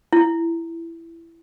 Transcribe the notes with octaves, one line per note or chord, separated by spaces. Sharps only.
E4